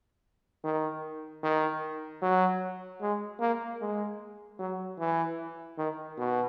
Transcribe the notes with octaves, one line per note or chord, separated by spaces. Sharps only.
D#3
D#3
F#3
G#3
A#3
G#3
F#3
E3
D#3
B2